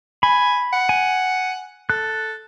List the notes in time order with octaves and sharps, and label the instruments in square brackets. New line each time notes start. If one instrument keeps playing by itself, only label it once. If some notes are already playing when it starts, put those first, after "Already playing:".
[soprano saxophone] G#5 [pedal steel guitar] B5
[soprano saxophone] F#5
[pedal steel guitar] G#5
[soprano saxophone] A4 [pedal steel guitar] F#6